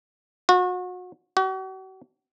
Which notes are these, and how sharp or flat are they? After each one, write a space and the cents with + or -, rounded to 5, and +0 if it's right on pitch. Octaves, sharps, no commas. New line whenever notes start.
F#4 -35
F#4 +40